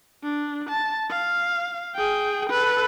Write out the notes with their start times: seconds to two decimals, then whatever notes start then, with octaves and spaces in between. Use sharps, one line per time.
0.23 D4
0.70 A5
1.10 F5
1.96 G#4 G5
2.49 A4 B4